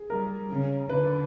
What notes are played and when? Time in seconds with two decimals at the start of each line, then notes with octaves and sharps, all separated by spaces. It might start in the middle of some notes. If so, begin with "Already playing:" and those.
Already playing: G#4
0.09 G3 A#4
0.50 C#3
0.89 D3 B4